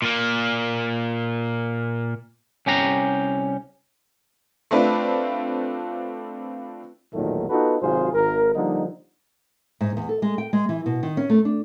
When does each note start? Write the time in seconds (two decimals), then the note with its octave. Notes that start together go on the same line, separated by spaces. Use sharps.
0.02 A#2 A#3
2.66 C2 C#4 G4 A#5
4.71 A3 C4 D4 F4 B4
7.14 B1 E2 A#2 D#3 F#3 A3
7.50 B3 D#4 F4 F#4 A4 B4
7.82 G#1 C3 F#3 F4 G#4 C5
8.14 G#1 A#4
8.55 D3 F3 G3 A#3 D#4
9.81 G#2
9.97 E2
10.09 A4
10.22 G#3
10.38 G5
10.53 G#3
10.69 E3
10.86 B2
11.03 D#3
11.17 C#4
11.30 A3
11.45 D4